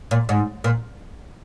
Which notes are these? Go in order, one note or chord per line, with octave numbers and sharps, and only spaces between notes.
A#2
G#2
A#2